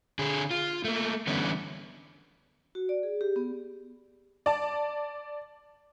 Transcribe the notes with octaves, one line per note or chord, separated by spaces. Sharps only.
D3 G#4
F4
A3 A#3
D3 E3 G3 B3 C#4
F#4
D5
G#4
G4
B3
D5 A5